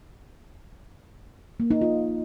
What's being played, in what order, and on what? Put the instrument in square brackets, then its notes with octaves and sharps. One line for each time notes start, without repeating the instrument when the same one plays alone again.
[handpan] A#3
D#4
F4